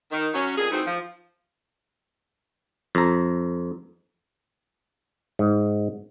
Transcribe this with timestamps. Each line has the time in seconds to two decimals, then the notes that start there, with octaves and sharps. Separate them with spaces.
0.12 D#3
0.34 F#3 C#4
0.57 F2 A#2 G#4
0.71 E3 A3 C4 D#4 F#4
0.86 F3
2.95 F2 A#5
5.39 G#2